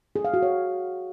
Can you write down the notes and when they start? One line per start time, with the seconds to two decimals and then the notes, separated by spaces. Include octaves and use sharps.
0.16 G#4
0.25 F5
0.34 F#4
0.43 C#5